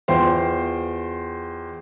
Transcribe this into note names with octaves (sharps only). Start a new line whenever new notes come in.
E2 F4 C5 G5